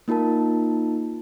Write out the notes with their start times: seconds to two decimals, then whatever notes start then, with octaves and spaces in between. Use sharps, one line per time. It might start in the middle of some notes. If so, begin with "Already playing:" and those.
0.08 A#3 D#4 F4 A#4 A5